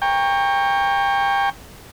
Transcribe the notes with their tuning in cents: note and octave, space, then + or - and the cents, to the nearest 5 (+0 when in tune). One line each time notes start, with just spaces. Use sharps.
G5 +25 A#5 +0 C#6 +0